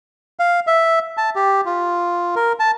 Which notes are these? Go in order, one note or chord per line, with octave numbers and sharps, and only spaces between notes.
F5
E5
A5
G4
F4
A#4
A5